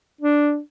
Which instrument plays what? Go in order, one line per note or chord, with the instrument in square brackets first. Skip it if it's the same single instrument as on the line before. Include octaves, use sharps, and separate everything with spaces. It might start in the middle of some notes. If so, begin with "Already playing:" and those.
[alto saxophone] D4